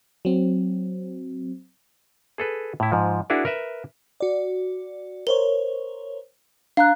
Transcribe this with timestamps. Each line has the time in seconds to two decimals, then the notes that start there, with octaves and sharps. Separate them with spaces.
0.25 F#3 C4
2.38 G#4 A4 B4
2.80 A2 E4
2.92 G#2 F3
3.30 D4 E4 F#4 G#4 A#4
3.45 A#4 B4 E5
4.20 F#4 D5
5.27 A#4 C5 C#5 G7
6.77 D4 F5 A#5 F#6